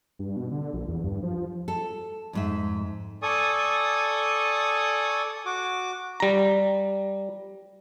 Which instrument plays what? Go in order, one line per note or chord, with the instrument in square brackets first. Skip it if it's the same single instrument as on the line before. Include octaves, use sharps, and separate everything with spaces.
[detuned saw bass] G2
B2
D3
A#1
E2
G2
F3
[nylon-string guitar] A4
F2 G#2 E5
[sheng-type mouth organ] A4 D5 G#5 C#6 D#6
F#4 D6
[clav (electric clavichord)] G3 A#5